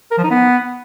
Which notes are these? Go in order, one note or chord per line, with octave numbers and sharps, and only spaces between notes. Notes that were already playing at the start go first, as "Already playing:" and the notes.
A#4
F3
D#4
B3